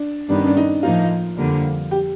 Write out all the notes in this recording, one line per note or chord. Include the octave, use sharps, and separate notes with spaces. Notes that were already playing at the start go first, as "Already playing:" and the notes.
Already playing: D4
G2 D#3 G3 B3 D4
C#4
D4
D#4
A2 F3 A#3 D#4 F4
F2 D3 G3 A#3
G4